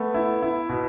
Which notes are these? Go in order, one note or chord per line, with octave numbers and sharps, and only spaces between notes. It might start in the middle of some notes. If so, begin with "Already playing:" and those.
Already playing: A3 B3
E4
E4
B2